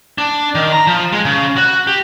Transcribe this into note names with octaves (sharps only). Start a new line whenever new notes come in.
D4
D#3
A#5
F3
G#3
C#3
F#4
G4